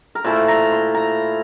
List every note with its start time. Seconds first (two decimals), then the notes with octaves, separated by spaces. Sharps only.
0.15 A#4
0.24 A#2 A3 E4 C5
0.48 A#5
0.72 C6
0.94 A#5